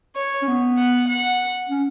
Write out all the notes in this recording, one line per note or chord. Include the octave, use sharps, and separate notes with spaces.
C#5
C#4
B3
F#5
F#5
C#4